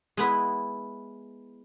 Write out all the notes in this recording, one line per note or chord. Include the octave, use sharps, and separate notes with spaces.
G#3 B3 E4